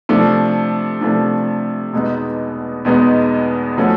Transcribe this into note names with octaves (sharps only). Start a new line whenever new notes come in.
C3 F3 A3 D4
C3 F3 A3 D4
E2 B2 G#3 B3 D#4
E2 B2 G#3 B3 D#4
F3 A3 C#4 F#4